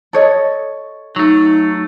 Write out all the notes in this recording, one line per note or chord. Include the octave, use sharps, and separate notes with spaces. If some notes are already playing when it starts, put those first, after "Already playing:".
A4 C#5 D#5
F#3 A3 D#4